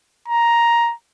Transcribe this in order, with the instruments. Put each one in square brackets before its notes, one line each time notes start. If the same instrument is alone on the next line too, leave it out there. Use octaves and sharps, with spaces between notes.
[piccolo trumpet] A#5